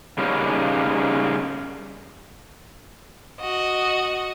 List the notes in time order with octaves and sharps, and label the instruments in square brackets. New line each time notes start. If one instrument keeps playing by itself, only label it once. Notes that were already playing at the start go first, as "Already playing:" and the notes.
[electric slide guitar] C#3 G3 A#3 C#4 D#4
[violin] F#4 D#5